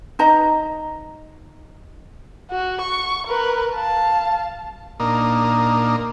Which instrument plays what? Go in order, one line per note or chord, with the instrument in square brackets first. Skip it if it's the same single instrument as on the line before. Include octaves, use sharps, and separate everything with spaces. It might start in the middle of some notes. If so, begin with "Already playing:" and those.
[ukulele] D#4 B4 D#5 A#5
[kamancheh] F#4
C#6
A#4 B4
F5 A5
[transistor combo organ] A#2 A#3 D4 D#4